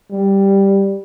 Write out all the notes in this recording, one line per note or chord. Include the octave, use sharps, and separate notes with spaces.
G3